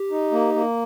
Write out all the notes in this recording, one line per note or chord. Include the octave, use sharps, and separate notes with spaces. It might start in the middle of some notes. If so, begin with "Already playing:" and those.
Already playing: G4
D#4
A#3
A#3